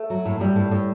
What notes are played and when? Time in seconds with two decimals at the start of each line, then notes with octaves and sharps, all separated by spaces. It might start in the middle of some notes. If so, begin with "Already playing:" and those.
Already playing: A3
0.10 F#3
0.25 A2
0.40 A2 G3
0.56 A2
0.71 A2